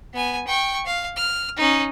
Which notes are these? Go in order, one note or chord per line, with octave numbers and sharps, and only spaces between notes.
B3 G#5
G5 C#6
F5
F6
C#4 D#4